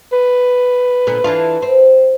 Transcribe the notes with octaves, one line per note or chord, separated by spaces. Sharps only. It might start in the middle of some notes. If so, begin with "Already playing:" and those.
B4
A#2 D3 B3
E3 D4 F4
C4